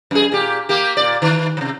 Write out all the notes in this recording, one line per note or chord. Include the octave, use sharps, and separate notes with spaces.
F#2 G#4
A#2 G4
A#3 G4
A#2 D5
D#3
C3 E3